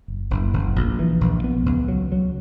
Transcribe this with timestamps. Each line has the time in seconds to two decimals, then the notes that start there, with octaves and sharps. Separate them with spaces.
0.08 F#1
0.30 F#1
0.53 F#1
0.76 A#1
0.99 E3
1.21 A#1
1.44 B3
1.66 C#2
1.88 F#3
2.12 F#3